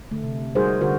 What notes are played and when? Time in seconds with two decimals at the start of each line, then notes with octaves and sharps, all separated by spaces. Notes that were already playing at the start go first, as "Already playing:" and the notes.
0.11 D3 A3
0.24 C3
0.55 G3 D#4 F#4 G#4 A#4 C5
0.81 D3 F#4 A#4 C5